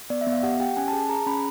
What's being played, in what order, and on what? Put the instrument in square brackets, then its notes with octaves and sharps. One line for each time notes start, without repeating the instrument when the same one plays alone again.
[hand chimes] B3 D5
E5
B3
F5
G4 F#5
G4 G5
C#4 G#5
A5
G#4
A5
G#4 A#5
C#4 B5